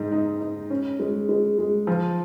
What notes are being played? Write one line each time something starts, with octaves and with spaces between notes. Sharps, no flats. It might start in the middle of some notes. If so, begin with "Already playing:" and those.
Already playing: G#2
D#4
D#4
C#4
G#3
G#3
G#3
F3